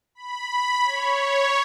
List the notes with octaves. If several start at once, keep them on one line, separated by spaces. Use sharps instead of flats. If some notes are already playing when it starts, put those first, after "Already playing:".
B5
C#5